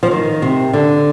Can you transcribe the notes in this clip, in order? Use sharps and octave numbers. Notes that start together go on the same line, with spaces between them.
F3
D#3
C3
D3